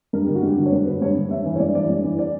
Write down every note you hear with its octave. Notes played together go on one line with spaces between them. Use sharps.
G2 A#4
D3 G4
F#4
G2 G4
D3
C#5
G2 B4
D3 B4
G2 C#5
D3
G2 E5
E3
C#5
G2 D5
E3 D5
G2
E3
D5